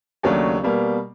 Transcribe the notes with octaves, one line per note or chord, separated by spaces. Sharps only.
D#2 C#3 F#3 A3 D4
B2 G3 A#3